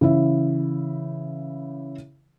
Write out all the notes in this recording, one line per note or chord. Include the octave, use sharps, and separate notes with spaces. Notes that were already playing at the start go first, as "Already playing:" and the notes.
C#3 E3 E4 E5